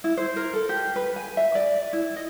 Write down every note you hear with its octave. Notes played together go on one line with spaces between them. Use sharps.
E4
C5
A#4
A4
G4
B4
G#5
E5
D5
E4
D#5